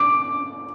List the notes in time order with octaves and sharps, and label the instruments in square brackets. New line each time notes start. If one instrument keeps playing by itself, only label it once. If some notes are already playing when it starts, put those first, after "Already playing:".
Already playing: [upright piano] D6